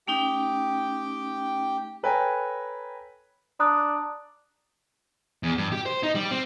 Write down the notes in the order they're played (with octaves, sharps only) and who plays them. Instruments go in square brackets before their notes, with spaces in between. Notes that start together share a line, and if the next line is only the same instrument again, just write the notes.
[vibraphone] A3 C#4 D#4 [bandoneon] G4 G5
[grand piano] A4 B4 C#5 G5 G#5 A#5
[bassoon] D4 [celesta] A#5 D#6 F#6
[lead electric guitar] E2
G2
G4
C5
D#4
G3
C4